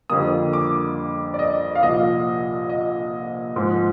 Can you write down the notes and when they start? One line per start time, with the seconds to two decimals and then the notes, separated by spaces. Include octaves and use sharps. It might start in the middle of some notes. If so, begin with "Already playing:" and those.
0.10 F2 D3 G3 A#3 D#6
0.53 D6
1.34 D5
1.39 D#5
1.75 F5
1.83 C2 A#2 F3 D#5
2.70 D#5
3.56 G#2 F3 G#3